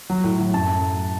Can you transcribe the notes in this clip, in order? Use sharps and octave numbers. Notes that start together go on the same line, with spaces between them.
F#3
A2
F#3
F#2 A5